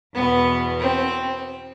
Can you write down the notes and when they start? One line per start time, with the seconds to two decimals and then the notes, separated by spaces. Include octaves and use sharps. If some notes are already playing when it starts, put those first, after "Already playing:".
0.14 E2 B2 B3
0.80 C4